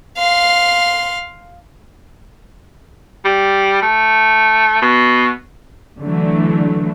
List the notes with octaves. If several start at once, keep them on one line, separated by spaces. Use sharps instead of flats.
F5 C6
G3
A3
B2
D3 E3 F#3 A3